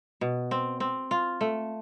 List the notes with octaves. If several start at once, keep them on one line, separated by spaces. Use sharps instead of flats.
B2
C4
C4
F4
A3